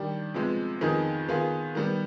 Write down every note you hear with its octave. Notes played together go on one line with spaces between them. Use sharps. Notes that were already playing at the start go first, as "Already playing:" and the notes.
Already playing: D#3 G3 D4 G4
C3 F3 G#3 B3
F2 D#3 B3 D#4 G#4
D#3 B3 F4 G#4
D#3 G3 B3